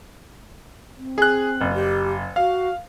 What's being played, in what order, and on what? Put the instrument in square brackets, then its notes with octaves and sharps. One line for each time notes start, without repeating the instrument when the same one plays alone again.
[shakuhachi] C4
[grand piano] G#4 F#6
F#1
[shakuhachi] G4
[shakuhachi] F#4 [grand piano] F5